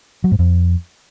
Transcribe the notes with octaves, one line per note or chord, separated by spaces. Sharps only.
F#3
G#2
F2